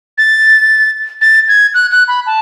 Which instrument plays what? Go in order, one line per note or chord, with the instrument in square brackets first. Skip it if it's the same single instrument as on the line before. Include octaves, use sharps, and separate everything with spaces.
[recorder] A6
A6
G#6
F#6
F#6
B5
A5